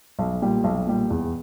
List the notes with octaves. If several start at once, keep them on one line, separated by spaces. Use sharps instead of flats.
B1
A#2 G3
B1
A#2 G3
E2